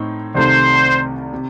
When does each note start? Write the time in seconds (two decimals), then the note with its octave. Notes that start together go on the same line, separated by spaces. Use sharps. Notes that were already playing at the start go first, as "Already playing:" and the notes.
Already playing: A2 C4 D#4
0.35 C2 C3 D#3 A3 C5
1.34 C3